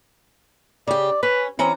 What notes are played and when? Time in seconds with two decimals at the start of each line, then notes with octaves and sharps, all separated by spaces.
0.87 C#3 G4 D5
1.23 C#4 B4
1.59 E3 C4 C#4 A#5